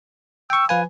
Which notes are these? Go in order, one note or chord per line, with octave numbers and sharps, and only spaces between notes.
G5 C#6 E6
F3 B4 F5 G#5